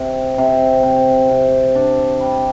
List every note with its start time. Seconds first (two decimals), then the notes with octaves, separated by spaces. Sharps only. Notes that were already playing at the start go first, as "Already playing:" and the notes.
Already playing: C3
0.38 C3
0.83 C3
1.30 C3
1.75 D4
2.20 G3